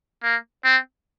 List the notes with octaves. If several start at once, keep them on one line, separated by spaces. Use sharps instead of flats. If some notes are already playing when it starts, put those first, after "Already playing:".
A#3
C4